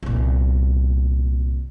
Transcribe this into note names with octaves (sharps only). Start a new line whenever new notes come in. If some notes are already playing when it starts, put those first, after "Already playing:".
C2 A#2